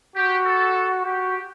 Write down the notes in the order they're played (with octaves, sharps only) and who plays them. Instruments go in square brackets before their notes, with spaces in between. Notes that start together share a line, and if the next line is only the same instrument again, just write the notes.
[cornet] F#4 [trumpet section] G4
[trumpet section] A4
[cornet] F#4 [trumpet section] G4